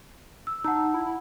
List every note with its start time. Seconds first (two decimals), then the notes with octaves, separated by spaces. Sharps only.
0.47 E6
0.64 D#4 F#5 A5 E6
0.94 E4